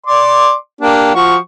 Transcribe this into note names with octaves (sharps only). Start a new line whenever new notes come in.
D5 C6 D6
A#3 D4 G4
F3 F#4 C#6